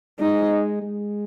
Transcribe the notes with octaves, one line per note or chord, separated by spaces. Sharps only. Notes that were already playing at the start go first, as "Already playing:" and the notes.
G#3 D#4
G#3